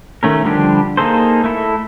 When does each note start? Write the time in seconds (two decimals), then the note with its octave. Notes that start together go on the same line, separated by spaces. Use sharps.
0.23 D#3 A3 C#4 A#4
0.45 D3 F3 G3 D4 G4
0.97 A#3 D#4 G#4 A4 C5
1.44 A3 E4 A4